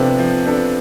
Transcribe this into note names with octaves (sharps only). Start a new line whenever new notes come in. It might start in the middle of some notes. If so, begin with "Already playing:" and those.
Already playing: C3 F3 B3 C4 D4 A4
F3
B3 D4 A4